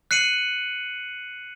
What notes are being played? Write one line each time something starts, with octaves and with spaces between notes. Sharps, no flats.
F#6 C7 C#7 D#7 F#7